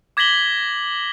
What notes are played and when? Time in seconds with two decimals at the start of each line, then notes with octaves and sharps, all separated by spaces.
0.17 D6 G#6 A#6 B6 F#7 G7